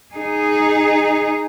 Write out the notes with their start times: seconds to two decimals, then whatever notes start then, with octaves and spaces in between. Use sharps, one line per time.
0.14 D#4 G#4